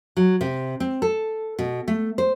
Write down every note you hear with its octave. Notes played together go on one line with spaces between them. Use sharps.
F#3
C3
C4
A4
B2
A3
C5